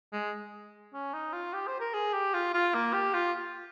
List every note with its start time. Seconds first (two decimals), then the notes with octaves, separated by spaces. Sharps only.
0.13 G#3
0.94 C#4
1.13 D#4
1.33 F4
1.53 G4
1.67 C5
1.80 A#4
1.94 G#4
2.13 G4
2.34 F4
2.54 F4
2.74 A#3
2.93 G4
3.14 F4